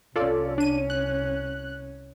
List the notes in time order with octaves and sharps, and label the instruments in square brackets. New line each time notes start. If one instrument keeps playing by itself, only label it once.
[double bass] C2 C#4 [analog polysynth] F4 A4 D5
[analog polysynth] D4 D#7
F#6